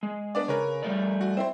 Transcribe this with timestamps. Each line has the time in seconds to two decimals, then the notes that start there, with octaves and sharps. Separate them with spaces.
0.03 G#3
0.35 B3 D4 D5
0.48 C#3 A#4 B4 C#5
0.82 G3 A3 D5
1.21 F#4
1.37 C4 E4 C5